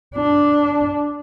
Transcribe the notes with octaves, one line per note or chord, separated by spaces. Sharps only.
D4